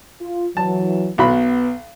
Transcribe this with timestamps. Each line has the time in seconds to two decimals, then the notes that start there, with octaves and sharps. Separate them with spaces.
0.21 F4
0.57 E3 F#3 A5
1.18 B1 B3 F#4 B5